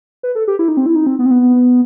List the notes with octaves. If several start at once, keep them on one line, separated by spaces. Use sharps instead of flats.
B4
A4
G4
E4
D#4
C4
E4
D#4
C4
B3
C4
B3